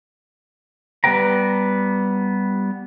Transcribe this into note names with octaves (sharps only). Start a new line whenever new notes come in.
G3 B3 B4 G5 A#5